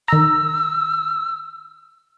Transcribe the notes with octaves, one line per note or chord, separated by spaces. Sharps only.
D#3 A#5 E6